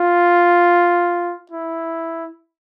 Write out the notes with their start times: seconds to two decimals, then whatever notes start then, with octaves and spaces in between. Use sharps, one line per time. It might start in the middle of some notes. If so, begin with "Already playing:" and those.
Already playing: F4
1.52 E4